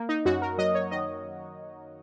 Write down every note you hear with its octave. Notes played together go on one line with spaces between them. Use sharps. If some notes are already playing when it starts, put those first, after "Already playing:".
Already playing: A#3
D#4
F#2 F#4
A#4
F#3 D#5
C#5
D#3 D#5